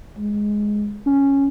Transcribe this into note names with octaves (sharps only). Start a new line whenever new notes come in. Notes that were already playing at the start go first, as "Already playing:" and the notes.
G#3
C#4